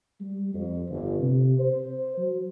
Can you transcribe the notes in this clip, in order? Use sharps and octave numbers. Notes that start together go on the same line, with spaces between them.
G3
F2
G1
C3
C5
F#3